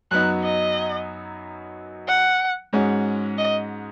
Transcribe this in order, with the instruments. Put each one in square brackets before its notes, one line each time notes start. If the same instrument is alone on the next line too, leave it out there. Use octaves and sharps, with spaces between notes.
[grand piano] F#2 F#3 B3 D#4 [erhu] F#6
[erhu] D#5
F#5
[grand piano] G#2 G#3 C#4 F#4
[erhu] D#5